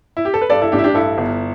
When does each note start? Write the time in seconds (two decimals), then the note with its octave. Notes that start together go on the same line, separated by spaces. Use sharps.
0.17 E4
0.25 G4
0.34 A4
0.41 B4
0.50 G2 A4 D5
0.62 E4 A4
0.72 A1 D4 G4
0.78 E4
0.84 D4 G4
0.94 G2 E4 A4
1.18 G1